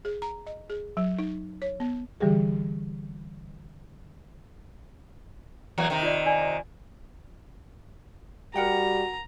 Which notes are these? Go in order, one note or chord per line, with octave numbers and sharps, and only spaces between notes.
G#4
A#5
D#5
G#4
F#3
D#4
C#5
B3
D3 E3 G3 G4 G#4
E2 F#3 A#3
C3 D#3
F4 D5
D5 G#5
D5
G3 F#4 A#4 F#5 G5 A#5